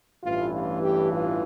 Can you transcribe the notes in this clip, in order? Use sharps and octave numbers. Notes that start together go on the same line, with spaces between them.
A1 G2 E3 F4
F4
G4
F4